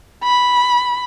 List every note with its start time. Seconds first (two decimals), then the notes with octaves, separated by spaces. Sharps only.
0.24 B5